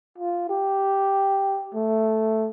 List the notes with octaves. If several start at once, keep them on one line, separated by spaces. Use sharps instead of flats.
F4
G4
A3